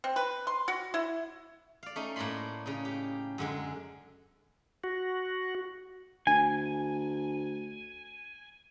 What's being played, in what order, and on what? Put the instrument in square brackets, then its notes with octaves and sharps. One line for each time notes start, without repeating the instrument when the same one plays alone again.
[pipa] C4
B4
C6
F#4
E4
[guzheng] D5 F5
A3 C#4 D#4
A2 A#3 D5 A5 B5 C6
C#3 C#4 D#4
G4
F#2 D3 G#3
[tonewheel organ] F#4
[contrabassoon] D2 [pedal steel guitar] G#5